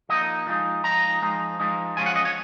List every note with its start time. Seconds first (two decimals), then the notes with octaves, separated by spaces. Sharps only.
0.09 F3 A#3 D#4 D#5
0.47 F3 G#3 D#4
0.84 F3 G#3 D#4 A#5
1.22 F3 G#3 D#4
1.60 F3 G#3 D#4
1.97 F3 G#3 C#4 F4 G#5
2.06 F#5
2.16 D#5
2.25 C#5